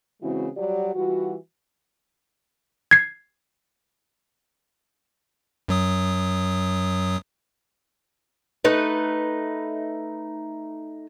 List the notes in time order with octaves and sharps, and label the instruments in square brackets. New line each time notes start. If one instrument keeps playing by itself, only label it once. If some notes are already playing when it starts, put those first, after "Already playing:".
[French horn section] C#3 E3 G#3 C4 E4 F#4
F#3 G3 F#4 G4 D5
E3 G3 F4 F#4
[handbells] G#6 C7
[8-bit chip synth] F#2 F#3 D#6
[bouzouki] A3 D#4 B4